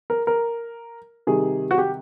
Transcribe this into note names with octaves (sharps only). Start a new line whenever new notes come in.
A#4
A#4
C3 D#3 G3 G#4
F#4
G4